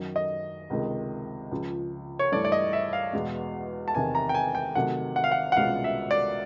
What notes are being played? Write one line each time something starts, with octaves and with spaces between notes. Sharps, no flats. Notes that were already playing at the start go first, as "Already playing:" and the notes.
Already playing: F#2 D#3 F#3
D#5
C#2 C3 D#3 G#3
C#2 C#3 F3
C#5
G2 E3 A3 D5
D5
D#5
E5
F5
E2 B2 G#3
A5
E2 C3 D#3 G#5
A#5
G5
G#5
G5
C3 D#3 F#3 A3 F#5
F#5
F5
F#5
F#5
C2 B2 G#3 C#4 F4 F5
E5
D5